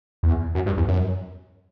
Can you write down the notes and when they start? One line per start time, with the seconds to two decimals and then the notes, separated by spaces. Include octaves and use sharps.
0.23 E2
0.55 F#2
0.66 G2
0.77 E2
0.88 F#2